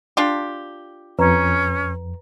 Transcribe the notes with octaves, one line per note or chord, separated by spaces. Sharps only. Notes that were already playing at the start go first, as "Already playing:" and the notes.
D4 F4 G4
F2 C#4 B4 A#5